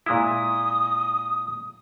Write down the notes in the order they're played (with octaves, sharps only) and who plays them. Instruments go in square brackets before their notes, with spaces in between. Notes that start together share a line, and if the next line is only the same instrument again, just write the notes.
[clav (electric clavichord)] A#2 G#3 E4 [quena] D#6